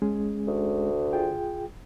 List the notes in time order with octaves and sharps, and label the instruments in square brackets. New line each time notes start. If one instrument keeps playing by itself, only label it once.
[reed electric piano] G#3 C#4 G#4
[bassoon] D2
[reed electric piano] F4 G#4 G5